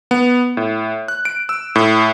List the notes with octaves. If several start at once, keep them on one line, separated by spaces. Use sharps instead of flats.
B3
A2
F#6
D7
E6
A2